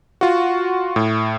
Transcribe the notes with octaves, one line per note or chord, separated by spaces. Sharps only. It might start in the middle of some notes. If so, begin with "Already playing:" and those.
F4 F#4
A2